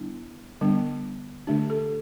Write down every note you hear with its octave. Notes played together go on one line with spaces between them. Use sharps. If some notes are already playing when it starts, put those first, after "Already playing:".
Already playing: D3 G3 B3 D4 E4
D3 G3 B3 D4
D3 A3 D4 G4
A4